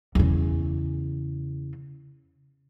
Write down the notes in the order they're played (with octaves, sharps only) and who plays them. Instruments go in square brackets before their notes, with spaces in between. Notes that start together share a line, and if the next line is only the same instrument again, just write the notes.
[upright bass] E2 C#3